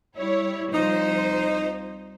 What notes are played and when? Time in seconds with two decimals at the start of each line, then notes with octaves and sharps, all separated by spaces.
0.16 G3 E4 C#5
0.73 C2 F3 D#4 C5